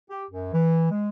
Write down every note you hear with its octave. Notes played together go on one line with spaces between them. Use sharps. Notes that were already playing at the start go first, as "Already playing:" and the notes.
G4
F#2
E3
G#3